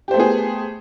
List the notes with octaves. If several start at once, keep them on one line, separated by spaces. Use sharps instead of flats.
A3 B3 G4 G#4 C5